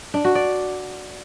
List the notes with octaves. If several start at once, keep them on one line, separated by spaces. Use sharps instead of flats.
D4
F#4
D5